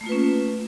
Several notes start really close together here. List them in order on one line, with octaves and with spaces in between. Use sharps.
A3 A#3 F4 B4 C#4